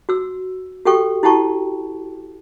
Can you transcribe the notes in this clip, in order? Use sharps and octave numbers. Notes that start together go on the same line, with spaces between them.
F#4 E6
F#4 G4 A4 G5 C#6
E4 F#4 G4 G5 A5 C#6